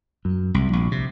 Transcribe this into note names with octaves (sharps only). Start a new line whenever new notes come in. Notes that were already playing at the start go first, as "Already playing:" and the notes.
F#2
C2
A#1
C3